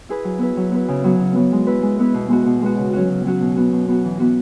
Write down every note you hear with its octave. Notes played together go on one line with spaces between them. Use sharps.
E4 G#4 B4
F#3
B3 E4 B4
F#3
B3 E4 B4
C#3
F#3 B3
C#3
F#3 B3
G#3
B3 E4 B4
G#3
B3 E4 B4
B2
G#3 B3 F#4
B2
G#3 B3 F#4
C#3
F#3 C#4 F#4
C#3
F#3 C#4 F#4
B2
B3 F#4
B2
B3 F#4
E3
B3 F#4 B4